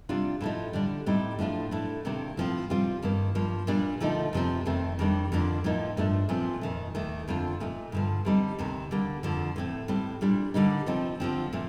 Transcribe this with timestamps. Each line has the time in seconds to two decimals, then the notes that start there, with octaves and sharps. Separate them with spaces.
0.09 C3 G3 D4 F4
0.41 A2 F3 A3 D#4
0.73 D3 G3 D4
1.06 A2 G3 C4 D#4
1.39 A2 F3 A3 D4 F4
1.71 A2 A3 D4
2.05 C3 D#3 A#3 D4
2.37 A2 F3 C4 F4
2.70 C3 G3 C4 F4
3.02 G2 D#3 A#3
3.35 G2 F3 A#3
3.67 A#2 G3 A#3 D4
4.00 D3 F3 A3 D#4
4.33 F2 C3 F3 C4
4.66 F2 D#3 A3 C4
4.99 F2 D#3 G3 A#3 D4
5.32 F2 D3 F3 A#3 D4
5.64 A2 F3 A#3 D#4
5.97 G2 F3 A3 D4
6.29 A#2 F3 C4
6.61 F2 D#3 A3
6.95 D#2 D#3 A3
7.28 F2 D3 F3 C4 F4
7.60 A#2 A3 D#4
7.92 G2 D3 F3
8.25 D3 G3 C4 D#4
8.59 D2 C3 D#3
8.91 D3 G3 A#3
9.23 F2 D3 F3
9.56 A2 A3 C4
9.88 A2 G3 C4
10.21 A#2 G3 D4
10.54 D3 G3 A#3 D#4
10.86 C3 F3 C4 D#4
11.20 D3 F3 C4
11.53 A#2 A3